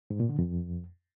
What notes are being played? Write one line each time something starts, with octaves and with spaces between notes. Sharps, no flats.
G#2
A#2
D3
F2